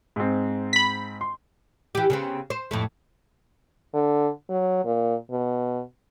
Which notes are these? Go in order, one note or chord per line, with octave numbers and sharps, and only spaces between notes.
G#2 C4
B5 B6
C6
E3 G4
C#3 B3 C4
C5
F2 A2 A3
D3
F#3
A#2
B2